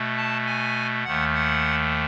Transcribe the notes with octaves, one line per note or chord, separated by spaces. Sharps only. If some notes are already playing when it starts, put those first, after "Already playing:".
Already playing: B2 A3
A5
G#5
D#2 D#3 A3 F#5
F#5